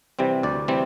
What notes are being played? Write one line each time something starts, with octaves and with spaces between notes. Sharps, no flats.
C3 E3 G3 C4
D2 D5
C3 E3 G3 C4